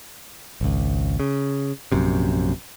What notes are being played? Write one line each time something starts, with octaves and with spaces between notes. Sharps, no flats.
G#1 C#2
C#3
A#1 F#2 C3